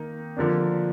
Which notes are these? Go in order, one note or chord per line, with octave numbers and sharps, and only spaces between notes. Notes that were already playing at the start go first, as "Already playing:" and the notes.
Already playing: D#3 A#3 D#4
D3 F3 A#3 D4